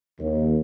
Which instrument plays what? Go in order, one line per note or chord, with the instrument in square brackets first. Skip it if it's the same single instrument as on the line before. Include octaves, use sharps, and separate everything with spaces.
[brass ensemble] D#2